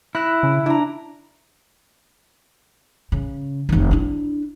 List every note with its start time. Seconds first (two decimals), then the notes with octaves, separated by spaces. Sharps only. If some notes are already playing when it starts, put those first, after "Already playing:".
0.15 E4 F#6 A#6 E7
0.43 C#3
0.66 D4 E4 A#5
3.12 C#3
3.69 F1 D#3
3.91 D4 E4